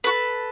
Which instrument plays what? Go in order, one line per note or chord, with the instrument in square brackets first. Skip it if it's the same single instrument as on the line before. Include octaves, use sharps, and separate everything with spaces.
[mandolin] F#4 A4 B4